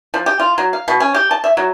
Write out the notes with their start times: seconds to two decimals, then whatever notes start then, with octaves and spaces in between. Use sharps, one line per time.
0.14 F3
0.26 G4
0.39 F4
0.58 F#3
0.73 F5
0.88 B2
1.00 C#4
1.14 G4
1.31 A5
1.44 E5
1.57 F#3